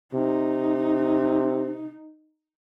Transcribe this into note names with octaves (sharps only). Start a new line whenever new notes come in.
C3 D#4